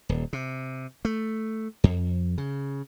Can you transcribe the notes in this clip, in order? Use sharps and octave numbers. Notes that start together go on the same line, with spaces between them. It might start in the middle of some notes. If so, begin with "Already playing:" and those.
D#1
C3
A3
F2
C#3